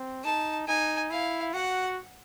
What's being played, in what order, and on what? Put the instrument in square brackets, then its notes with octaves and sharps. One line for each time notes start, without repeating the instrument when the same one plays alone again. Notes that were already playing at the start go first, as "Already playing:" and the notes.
Already playing: [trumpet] C4
[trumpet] D#4 [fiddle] A5
[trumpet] D#4 [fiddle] G#5
[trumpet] E4 [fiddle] F5
[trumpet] F#4 [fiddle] F#5